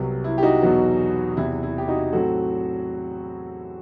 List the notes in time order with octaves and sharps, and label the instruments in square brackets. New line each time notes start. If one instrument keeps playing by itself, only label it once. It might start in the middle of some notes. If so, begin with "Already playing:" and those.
Already playing: [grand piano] C2 C3 F#3 B3
E4
G4
D#4 F#4
E2 B2 F#3 B3
E2 C3 E3 E4
E4
G4
D#4 F#4
A2 F#3 C4 F#4 A4